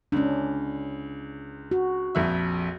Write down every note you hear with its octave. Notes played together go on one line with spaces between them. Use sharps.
C#2 C#4 D4
F#4
A#1 F2 E5